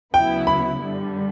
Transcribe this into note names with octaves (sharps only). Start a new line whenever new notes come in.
D2 C#3 F#3 B3 E4 G5
B5
G2 D3 G3